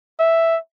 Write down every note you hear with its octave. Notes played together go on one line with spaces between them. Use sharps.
E5